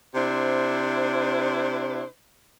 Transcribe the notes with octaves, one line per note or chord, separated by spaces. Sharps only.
C3 D4 E4 C5